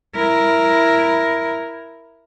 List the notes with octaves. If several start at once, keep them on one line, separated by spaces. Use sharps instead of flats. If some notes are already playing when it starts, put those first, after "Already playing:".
E4 A#4